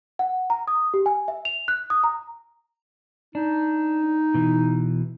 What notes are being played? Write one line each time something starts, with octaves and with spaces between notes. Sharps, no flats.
F#5
A#5
D#6
G4
G#5
E5
F7
F#6
D#6
A#5
D4 D#4
B2 E3